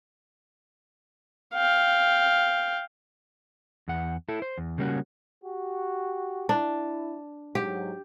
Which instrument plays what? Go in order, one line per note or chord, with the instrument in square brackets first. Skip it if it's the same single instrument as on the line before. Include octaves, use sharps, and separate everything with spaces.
[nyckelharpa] F5 G5
[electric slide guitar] E2 F#5
E4 A4
C5
E2
C#3 G3 A#3 C#4 F#4
[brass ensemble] F#4 G4
[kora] D4 [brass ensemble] E4
[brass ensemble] G#2 F#3 [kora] G4